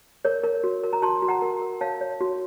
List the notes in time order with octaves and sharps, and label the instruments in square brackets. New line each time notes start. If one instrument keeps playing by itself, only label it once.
[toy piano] A#4 C#5
A#4
F#4
A#4
A#5
F#4 A5 C6
F#4
F#5 A#5
A#4
A#4
C#5 F5 A5
C#5
F#4